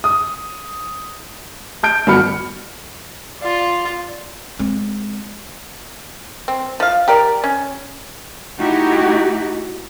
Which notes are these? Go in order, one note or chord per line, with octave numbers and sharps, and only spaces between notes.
D#6
A5 G6 D7
G1 F#3 B3 B5 F6 C#7
F4 D5
G#3 C4
C4
F3 F5
G4 A#4 D5
C#4
A3 D#4 E4 F#4 G4